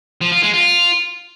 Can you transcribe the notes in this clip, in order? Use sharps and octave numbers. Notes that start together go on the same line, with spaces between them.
F3
F4
G#3
F4